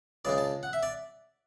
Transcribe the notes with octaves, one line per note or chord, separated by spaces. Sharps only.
C#2 C#3 G#3 D5
A5
F#5
E5
D5